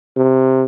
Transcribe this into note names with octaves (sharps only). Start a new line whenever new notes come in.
C3